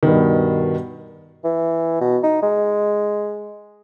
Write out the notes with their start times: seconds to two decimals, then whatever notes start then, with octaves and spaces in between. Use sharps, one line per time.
0.03 G2 B2 D#3
1.44 E3
2.01 B2
2.23 D#4
2.43 G#3